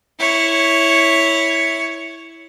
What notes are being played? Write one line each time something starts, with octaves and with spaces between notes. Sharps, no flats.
E4 C#5